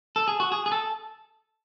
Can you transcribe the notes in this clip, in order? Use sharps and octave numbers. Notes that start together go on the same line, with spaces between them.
A4
G#4
F#4
G#4
G#4
A4